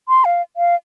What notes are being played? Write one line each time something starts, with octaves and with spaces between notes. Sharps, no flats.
C6
F5
F5